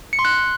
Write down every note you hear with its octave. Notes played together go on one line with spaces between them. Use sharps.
C#7
C6
F#6